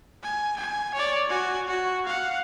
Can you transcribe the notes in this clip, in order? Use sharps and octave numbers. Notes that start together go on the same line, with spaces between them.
G#5
G#5
C#5 D5
F#4 G#5
F#4
F5 F#5